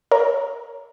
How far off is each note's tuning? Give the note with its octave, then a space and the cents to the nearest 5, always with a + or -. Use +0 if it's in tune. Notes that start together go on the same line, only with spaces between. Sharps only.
A#4 +0 C#5 +10